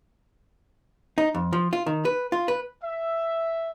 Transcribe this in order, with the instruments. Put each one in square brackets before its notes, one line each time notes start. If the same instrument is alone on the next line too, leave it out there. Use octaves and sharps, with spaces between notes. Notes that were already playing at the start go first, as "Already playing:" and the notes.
[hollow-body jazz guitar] D#4
F2
F3
F4
D#3
B4
F4
B4
[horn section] E5